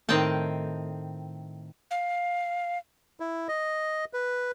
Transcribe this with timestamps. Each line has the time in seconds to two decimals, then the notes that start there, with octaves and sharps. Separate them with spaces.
0.09 A2 D#3 C4 D#5 G5 A5
1.91 F5
3.20 E4
3.48 D#5
4.13 B4